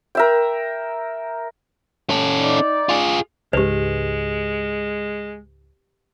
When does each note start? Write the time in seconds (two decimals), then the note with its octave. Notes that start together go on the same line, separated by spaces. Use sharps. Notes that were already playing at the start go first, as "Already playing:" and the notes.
0.15 A#4 E5 G5
2.10 C#4 A4
2.39 D#4 D5
2.89 F4 G#4
3.53 C#2 G#2 G#3 G4 B4